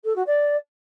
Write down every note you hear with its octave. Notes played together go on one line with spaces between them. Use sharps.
A4
F#4
D5